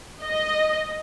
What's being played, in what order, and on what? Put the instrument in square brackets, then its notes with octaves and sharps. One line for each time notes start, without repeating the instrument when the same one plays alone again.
[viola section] D#5